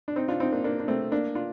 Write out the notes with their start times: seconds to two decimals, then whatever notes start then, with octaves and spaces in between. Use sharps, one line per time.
0.08 D4
0.16 C4 D#4
0.28 D4 F4
0.40 C4 D#4
0.52 A#3 D4
0.64 A#3 D4
0.80 D4
0.88 A3 C4
1.12 A#3 D4
1.35 D4 F4